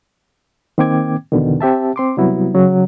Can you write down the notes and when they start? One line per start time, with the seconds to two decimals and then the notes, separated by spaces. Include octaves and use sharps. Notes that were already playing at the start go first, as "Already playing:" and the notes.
0.78 D#3 A#3 C4 G5 D6 G#6
1.32 E2 B2 D3 D#3
1.61 C4 G4 E5 A5
1.96 C4 C6 D6
2.17 C3 F#3 G3 B3 E4 F#4
2.54 C#3 F#3